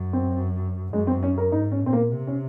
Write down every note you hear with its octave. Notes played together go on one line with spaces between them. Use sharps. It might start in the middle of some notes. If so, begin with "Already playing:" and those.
Already playing: F#2
C4
F#2 G#3
C4
C#4
A#4
G#2 D#4
C#4
A#2 C4
A#3
C3
C#4